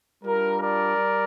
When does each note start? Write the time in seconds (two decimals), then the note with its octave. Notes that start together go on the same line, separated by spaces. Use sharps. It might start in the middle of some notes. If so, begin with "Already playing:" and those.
0.23 G3 D4 F4 A#4
0.59 A#4 D5
0.96 G3